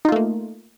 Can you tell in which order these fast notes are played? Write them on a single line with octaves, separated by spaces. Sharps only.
D#4 F4 A3 A#3